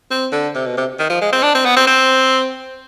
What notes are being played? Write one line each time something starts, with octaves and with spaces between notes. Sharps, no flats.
C4
D3
C3
B2
C3
D#3
F3
G#3
C4
D4
C4
B3
C4
C4